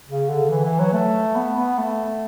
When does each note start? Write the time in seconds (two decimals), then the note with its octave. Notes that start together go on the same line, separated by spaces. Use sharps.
0.09 C#3
0.29 D3
0.50 E3
0.65 E3
0.80 F#3
0.93 A3
1.36 B3
1.57 B3
1.78 A3